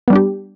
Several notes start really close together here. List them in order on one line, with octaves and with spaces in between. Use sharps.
B3 G3 D4 G4